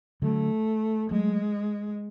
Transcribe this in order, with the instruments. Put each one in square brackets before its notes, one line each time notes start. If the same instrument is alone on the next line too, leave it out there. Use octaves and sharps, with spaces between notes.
[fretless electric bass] D3 F#3 [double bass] A3
[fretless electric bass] F#3 A3 [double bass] G#3